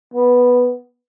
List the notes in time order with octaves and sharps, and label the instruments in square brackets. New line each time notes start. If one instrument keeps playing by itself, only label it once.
[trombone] B3